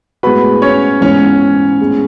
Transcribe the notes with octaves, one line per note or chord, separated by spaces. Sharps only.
A2 G#3 B3 F#4 B4 B5
C#4 C#5
G#2 E3 B3 C#4 C#5
A2 G#3 B3